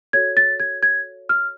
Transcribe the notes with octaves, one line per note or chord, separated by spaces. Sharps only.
F#4 A4 C#5 G#6
A6
G#6
G#6
F6